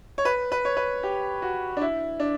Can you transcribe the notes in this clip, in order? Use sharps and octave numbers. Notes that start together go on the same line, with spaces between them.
C#5
B4
B4
C#5
B4
G4
F#4
D4
E4
D4